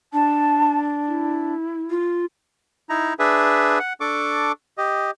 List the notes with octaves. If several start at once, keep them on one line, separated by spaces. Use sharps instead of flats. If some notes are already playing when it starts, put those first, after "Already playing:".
D4 A5
E4
F4
D#4 E4 A#5
D4 G#4 B4 E5
F#5
D4 A4 C#6 D6
G4 D#5